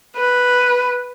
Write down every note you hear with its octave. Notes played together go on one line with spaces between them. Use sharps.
B4